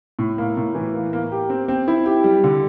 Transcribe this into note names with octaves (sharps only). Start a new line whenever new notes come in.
A2
A#3
A2
E3
A#3
A#3
G4
C4
C4
E4
G4
G3
D3